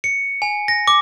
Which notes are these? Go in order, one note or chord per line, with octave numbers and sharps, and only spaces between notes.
C#7
G#5
A#6
D6